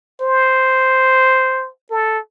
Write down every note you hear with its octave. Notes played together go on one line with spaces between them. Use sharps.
C5
A4